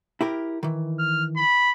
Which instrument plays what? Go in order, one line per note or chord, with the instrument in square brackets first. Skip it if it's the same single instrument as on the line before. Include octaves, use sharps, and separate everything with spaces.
[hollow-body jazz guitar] E4 G4 A#4
D#3 E3
[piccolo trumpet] F6
B5